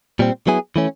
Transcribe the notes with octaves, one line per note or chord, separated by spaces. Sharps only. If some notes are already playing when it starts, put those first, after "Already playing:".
A#2 G3 C4
F#3 B3 E4 G#4
E3 A3 C#4